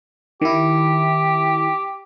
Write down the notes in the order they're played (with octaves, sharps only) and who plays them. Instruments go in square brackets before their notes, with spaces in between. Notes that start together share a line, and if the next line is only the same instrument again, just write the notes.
[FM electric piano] D#3 E4 [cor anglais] G4